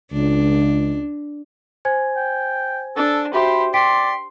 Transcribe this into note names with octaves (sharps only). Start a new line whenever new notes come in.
C#2 D4
C5 G#5 G#6
G5
D4 A4
F#4 G4 C5 E5 B5 C6
D5 G5 C6 B6 D7